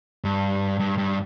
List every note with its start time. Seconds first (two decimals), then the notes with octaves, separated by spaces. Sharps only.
0.24 G2
0.80 G2
0.98 G2